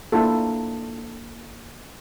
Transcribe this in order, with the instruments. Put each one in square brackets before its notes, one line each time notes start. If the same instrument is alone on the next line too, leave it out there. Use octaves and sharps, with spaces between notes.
[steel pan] A#3 D4 E4 F4 A4